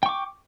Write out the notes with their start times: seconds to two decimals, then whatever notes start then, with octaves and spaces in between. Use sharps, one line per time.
0.03 G5
0.06 C#6
0.09 D6